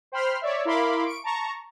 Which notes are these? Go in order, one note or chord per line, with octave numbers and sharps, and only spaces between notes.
C5 G5 B5 C6 F6 C7
C#5 D5 E5
E4 A#4 F5 B5 C6 D6
C#6 D7
A5 A#5 C#6